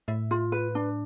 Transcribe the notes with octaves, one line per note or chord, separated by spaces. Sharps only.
A2 E5
F4
B4
D4